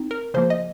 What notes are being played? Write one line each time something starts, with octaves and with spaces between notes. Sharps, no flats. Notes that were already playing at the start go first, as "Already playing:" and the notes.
Already playing: C4 D#4
A#4
C#3 F3 A#3 C5
D#5